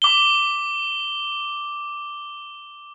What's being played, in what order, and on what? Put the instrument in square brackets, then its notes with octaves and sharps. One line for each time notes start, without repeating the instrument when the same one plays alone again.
[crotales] D6 G7